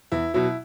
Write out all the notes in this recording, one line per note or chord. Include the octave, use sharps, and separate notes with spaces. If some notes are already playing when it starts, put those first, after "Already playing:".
E2 E4
B2 F#3 E4